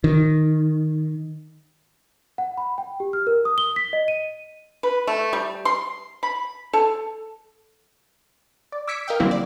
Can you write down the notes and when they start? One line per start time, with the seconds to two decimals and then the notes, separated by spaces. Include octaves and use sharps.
0.04 D#3
2.38 F#5
2.57 B5
2.78 G5
3.00 G4
3.13 F6
3.27 A#4
3.45 D#6
3.58 G7
3.76 B6
3.93 D#5
4.08 D#7
4.83 B4
5.07 A3
5.33 G3
5.65 C6
6.23 B5
6.73 A4
8.72 D5
8.87 D6 E6 G#6 B6 C#7 D7
9.08 A#4 D#5 F5 G5
9.20 D3 F#3 G3 A#3 C4 E4
9.31 D5